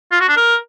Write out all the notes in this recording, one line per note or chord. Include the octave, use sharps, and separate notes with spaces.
F4
F#4
D4
A#4